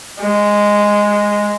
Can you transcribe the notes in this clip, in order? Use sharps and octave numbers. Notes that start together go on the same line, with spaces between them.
G#3